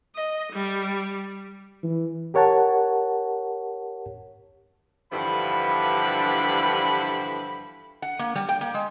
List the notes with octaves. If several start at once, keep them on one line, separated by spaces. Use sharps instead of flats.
D#5
G3
E3
G4 A#4 C#5 F#5 A5
G2 D3 E3 F3 B5
F#5
A#3
G3
G5
A#3
G#3